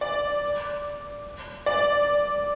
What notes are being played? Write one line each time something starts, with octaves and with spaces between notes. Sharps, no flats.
D5
D5